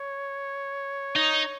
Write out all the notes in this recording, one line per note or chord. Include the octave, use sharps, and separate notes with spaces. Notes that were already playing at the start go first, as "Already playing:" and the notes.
Already playing: C#5
D#4